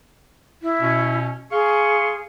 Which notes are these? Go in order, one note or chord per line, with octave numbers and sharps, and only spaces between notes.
E4
B2 C#4
G#4 F5 C6 C#6